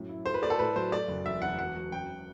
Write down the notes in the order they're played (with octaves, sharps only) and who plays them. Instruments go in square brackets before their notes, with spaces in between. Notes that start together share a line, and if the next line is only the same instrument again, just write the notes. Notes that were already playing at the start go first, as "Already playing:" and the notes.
Already playing: [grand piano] F#2 A2
E4
[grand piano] A3 [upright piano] C5
[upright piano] B4
[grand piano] A3 [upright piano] D5
[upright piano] A4
[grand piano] A2 [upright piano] B4
[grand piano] F#3 [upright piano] C5
[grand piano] A3 [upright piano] D5
[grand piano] F#1
[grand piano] E1 [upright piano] E5
[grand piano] E1 [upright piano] F#5
[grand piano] F#3 [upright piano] F#5
[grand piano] F#3
[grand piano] F#2 [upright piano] G5